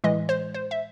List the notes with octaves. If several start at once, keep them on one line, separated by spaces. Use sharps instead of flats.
A2 E3 G#3 D#5
C5
C5
E5